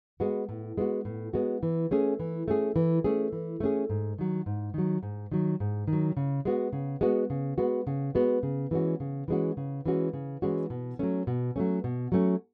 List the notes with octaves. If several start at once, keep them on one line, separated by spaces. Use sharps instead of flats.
G#3 B3 F#4
A2
G#3 B3 F#4
A2
G#3 B3 F#4
E3
A3 C#4 G#4
E3
A3 C#4 G#4
E3
A3 C#4 G#4
E3
A3 C#4 G#4
G#2
D#3 F#3
G#2
D#3 F#3
G#2
D#3 F#3
G#2
D#3
F#3
C#3
G#3 B3 F#4
C#3
G#3 B3 F#4
C#3
G#3 B3 F#4
C#3
G#3 B3 F#4
C#3
E3 G#3 C#4 F#4
C#3
E3 G#3 C#4 F#4
C#3
E3 G#3 C#4 F#4
C#3
E3 G#3 C#4 F#4
B2
F#3 A3 C#4
B2
F#3 A3 C#4
B2
F#3 A3 C#4